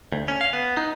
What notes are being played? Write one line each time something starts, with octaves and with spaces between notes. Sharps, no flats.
D2
C#4
F5
B3
D#4